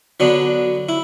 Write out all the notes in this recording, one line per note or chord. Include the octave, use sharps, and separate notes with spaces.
D3 F#3 B3 D4
E4